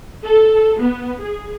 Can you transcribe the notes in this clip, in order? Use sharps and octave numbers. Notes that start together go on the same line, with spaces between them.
A4
B3
G#4